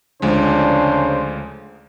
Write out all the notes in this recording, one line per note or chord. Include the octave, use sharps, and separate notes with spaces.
D2 C#3 F3 G#3 D4 C5